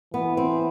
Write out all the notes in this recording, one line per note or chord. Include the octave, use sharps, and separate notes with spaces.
E3 B3
C4